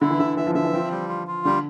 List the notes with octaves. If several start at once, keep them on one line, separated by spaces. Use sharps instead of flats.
D3 E4
E3
D3 E5
E3 E5
F3
D3 E5
E3
F3 C4
G3
F4
F4
D3 G3